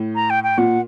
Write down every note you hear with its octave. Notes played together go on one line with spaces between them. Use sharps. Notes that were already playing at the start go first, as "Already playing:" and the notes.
Already playing: A2
A#5
G5
G5
A#2 F#5